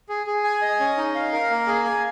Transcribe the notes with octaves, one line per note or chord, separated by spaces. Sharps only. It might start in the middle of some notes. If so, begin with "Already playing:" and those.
G#4
G#4
G#5
D#5
C#4
D#4
F5
A#4
A#3
G#4
G#5